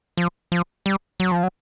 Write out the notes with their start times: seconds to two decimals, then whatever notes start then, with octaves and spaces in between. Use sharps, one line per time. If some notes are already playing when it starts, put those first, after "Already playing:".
0.17 F3
0.52 F3
0.86 G3
1.20 F#3
1.32 F3
1.43 F#3